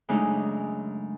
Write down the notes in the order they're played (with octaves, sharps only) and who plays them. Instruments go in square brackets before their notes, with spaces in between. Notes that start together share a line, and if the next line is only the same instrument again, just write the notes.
[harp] F#2 C#3 G#3 A3 D4 D#4